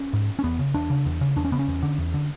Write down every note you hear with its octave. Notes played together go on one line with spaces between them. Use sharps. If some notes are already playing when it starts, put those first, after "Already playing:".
Already playing: C#4
G#2
C#4
E2 B3
C#3
E2 D4
C#3
E2
C#3
E2 D4
C#4
C#3 B3
C#4
E2
D3
E2
D3